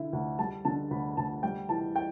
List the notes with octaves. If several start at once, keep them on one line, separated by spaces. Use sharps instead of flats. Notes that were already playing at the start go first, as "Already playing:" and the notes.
Already playing: D3 E4
D2
G3 A5
D3 A5
D2 B5
D2 A5
G3 G5
E3 A5
G5